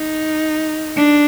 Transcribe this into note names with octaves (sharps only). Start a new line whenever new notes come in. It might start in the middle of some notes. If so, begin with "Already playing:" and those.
Already playing: D#4
D4